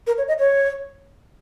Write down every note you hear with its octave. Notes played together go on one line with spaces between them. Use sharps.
A#4
C#5
D#5
C#5